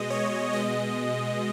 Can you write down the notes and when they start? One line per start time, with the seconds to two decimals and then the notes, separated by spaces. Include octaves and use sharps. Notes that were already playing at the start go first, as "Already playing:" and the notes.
Already playing: B2 G#3 D#5
0.10 C#5
0.53 B2 G#3 D#5